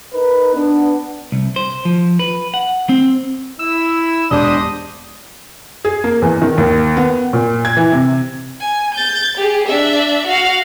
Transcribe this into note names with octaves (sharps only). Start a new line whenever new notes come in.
D#4 A#4 B4
B3 D4
C2
C5
F3
B4
F#5
C4
E4 E6
E1 D4 G4 C5 D#5 D#6
G#4
A#3
E2
D#3
D#2
B3
A#2
G#6
E3
C3
G#5
G6 A6
G4 G#4
D4 E5
F#4 F5